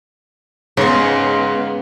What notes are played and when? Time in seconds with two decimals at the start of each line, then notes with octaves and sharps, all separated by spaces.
0.77 G#2 C#3 G#3 B3 C6